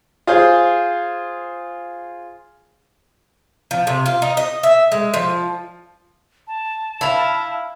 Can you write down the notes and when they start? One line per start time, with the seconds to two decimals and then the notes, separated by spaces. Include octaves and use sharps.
0.27 F4 G#4 C5
3.71 F3
3.87 C3
4.06 F4
4.22 D#4
4.37 D#5
4.63 E5
4.92 G#3
5.14 F3
6.47 A5
7.01 E4 F5 B5